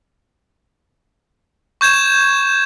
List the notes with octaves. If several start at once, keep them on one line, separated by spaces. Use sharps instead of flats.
C#6 G6 G#6 E7